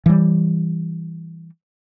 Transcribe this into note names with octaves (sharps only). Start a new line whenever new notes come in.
E3 G3